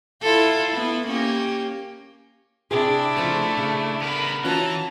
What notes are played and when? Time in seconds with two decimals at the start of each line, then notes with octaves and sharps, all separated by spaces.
0.22 E4 F4 A4
0.69 B3 E4
1.07 A#3 C#4 G4
2.71 C3 D4 E4 G#4
3.17 C#3 F3 A3
3.57 C#3
4.02 B3 A#4 B5
4.45 E3 C#4 F4 F#4 A5 A#5